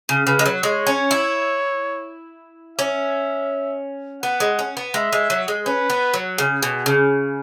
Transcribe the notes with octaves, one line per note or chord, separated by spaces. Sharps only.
C#3
C#3 B4
G#3
F#3
G#3 C#5
C#4
E4
C#4 E5
B3 F#5
G#3
C#4
B3
G#3 E5
G#3
F#3
G#3
C#4 B4
B3
F#3
C#3 G#4
B2
C#3